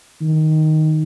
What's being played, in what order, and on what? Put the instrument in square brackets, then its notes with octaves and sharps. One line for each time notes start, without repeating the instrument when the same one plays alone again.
[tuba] D#3